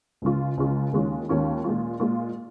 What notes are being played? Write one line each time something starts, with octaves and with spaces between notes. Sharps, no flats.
C#2 C#3 G#3 F4
C#2 C#3 G#3 F4
D#2 D#3 G#3 C#4 F4
D#2 D#3 G#3 C#4 F4
A#2 G#3 F4
A#2 G#3 F4